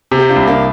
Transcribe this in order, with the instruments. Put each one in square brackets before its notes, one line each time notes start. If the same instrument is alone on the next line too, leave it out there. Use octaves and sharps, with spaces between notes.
[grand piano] C3
[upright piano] G4
D4 F4
[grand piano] C2
[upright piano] A#3 D4